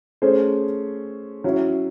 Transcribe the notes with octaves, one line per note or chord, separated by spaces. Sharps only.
A3 C#4 G#4 C5
F#3 C#4 E4